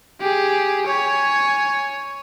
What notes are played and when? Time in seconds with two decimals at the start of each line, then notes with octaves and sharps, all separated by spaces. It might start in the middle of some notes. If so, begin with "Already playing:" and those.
0.21 G4 G#4
0.86 C#5 G#5